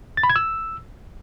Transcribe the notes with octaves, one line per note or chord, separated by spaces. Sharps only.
A6
B5
G#6
E6